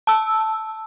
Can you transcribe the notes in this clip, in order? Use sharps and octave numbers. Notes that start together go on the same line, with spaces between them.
A5 E6